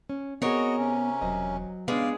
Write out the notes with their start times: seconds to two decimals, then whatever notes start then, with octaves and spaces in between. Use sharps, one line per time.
0.09 C#4
0.42 B3 C4 F#4 G#4 A#4 C#5 D#5
0.78 C3 C#4
1.22 E1 F#3 C5 D#5
1.88 C#3 G#3 B3 D4 B4 D5 F5